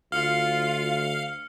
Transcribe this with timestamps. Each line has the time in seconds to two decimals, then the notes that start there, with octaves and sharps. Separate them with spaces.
0.12 D2 F4 F5 F6 C#7